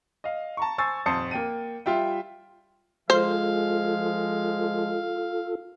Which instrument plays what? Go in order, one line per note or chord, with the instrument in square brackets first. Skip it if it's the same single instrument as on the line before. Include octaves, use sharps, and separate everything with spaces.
[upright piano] D#5 F5
A5 A#5 C#6
C5 G#5 C#6 E6 A6
D#1 F2 C5 A5 D#6 C#7
A#3 G5 D#7
G3 F4 E5 G5
[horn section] F3 G#3 [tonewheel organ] F4 A4 [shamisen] C5 [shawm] F5